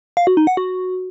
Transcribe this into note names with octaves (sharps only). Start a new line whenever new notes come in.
F5
F#4
D#4
F#5
F#4